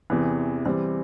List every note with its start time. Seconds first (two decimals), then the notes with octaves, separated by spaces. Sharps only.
0.10 E2 C3 E3
0.65 E3 G3 C4